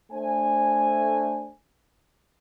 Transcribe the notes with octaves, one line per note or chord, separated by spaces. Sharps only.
A3 D4 C5 G#5